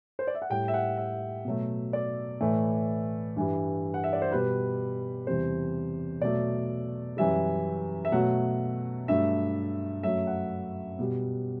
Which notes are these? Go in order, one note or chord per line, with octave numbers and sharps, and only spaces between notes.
C5
D5
E5
F#5
A2 G3 G5
E5
F#5
E5
B2 F#3 A3
D5
A2 E3 A3
G2 E3 G3
F#5
E5
D5
C5
B2 G3 B4
E2 C3 G3 C5
B2 F#3 A3 D5
F#2 E3 G3 E5
E5
B2 F#3 A3 F#5
G2 F#3 A3 E5
F#2 F#3 A3 E5
F#5
B2 G3